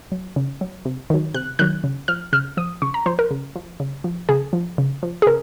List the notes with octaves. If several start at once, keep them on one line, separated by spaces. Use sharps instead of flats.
F#3
C#3
F#3
C3
D#3 F#3
C3 F#6
D#3 F#3 F#6
C#3
F3 F6
C#3 F6
F3 D#6
C#3 C#6
A#5
F3 C5
A#4
C#3
F3
C#3
F3
C#3 G#4
F3
C#3
F3
G#4
C#3 A#4